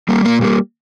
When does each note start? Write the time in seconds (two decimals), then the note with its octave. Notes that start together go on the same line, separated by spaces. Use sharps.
0.09 G3 A#3
0.25 A#2 A#3
0.41 G3 A#3